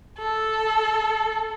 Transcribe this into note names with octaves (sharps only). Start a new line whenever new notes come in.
A4